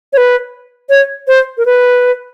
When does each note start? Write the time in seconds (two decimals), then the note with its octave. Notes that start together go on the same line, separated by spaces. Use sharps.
0.13 C#5
0.17 B4
0.90 C#5
1.28 C5
1.57 A#4
1.66 B4